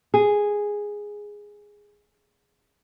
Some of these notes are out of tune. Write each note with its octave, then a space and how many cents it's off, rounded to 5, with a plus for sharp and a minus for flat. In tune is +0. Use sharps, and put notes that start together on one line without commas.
G#4 -5